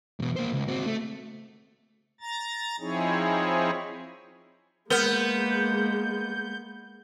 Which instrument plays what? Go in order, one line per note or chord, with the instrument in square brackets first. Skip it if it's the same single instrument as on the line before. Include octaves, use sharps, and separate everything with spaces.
[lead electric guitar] E2 B2
A#3 C5
C#2
C4 F#4
A3
[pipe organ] A#5 A6
F3 C4 D#4 E4 G#4 C#5
[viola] G#3 A#3 [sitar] B3 [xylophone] A#4 F6 [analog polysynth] G6